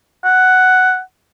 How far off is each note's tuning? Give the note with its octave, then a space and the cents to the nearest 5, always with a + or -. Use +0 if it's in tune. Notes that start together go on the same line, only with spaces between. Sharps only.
F#5 +5